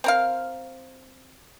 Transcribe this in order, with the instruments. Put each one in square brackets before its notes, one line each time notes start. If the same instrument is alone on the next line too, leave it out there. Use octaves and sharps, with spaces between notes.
[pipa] C4 A#4 F5